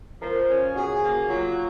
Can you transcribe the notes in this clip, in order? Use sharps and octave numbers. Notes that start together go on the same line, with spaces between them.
F3 A#4
C#4
F#4 G#4
A#3
F#3 F4